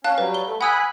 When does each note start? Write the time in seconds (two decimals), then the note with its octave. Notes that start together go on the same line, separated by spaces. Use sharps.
0.04 C#4 F5 A5 F#6
0.18 F#3 G3 B4
0.34 G7
0.46 A3
0.61 F#5 G#5 B5 D#6 E6 F#6